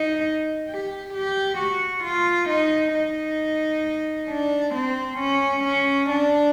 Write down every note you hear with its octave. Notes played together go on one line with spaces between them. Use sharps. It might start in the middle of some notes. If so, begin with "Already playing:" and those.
Already playing: D#4
G4
G4
F#4
F4
D#4
D#4
D4
C4
C#4
C#4
D4